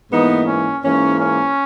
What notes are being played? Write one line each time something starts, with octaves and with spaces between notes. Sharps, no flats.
G#2 E3 A#3 B3 D#4
C#4
G#2 E3 A#3 C#4
C#4